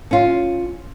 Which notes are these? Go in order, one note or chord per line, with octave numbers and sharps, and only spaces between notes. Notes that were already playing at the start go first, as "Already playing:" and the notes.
C#4 F4